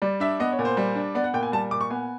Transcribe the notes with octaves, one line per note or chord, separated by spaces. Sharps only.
G3 D5
D4 E5
B3 D#5
C#5
A#2
C5
G3
D4
B3 D5
F#5
A#2 G5
G#5
G3 A5
A#2 D6
C#6
B3 G#5